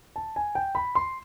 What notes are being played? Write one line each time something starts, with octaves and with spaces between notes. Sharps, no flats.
A5
G#5
G5
B5
C6